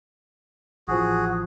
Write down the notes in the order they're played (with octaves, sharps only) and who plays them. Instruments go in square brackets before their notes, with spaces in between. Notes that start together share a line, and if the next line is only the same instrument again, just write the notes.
[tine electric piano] A1 F3 [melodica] F#4 G#4